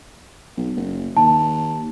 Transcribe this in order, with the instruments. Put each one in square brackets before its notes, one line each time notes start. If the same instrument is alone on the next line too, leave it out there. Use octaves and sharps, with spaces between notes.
[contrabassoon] B1
F#1
[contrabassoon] D#2 [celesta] A5